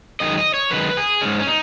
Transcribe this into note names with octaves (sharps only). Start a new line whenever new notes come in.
F#2 D#3 G#3 D#5
D#5
C#5
F#2 D#3 G#3 B4
G#4
G#2 G#3 C#4
C#4
D#4